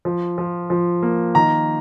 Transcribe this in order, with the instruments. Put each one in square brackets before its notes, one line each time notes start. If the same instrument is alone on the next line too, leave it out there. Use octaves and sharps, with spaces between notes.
[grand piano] F3
F3
F3
A#3
D#3 A#5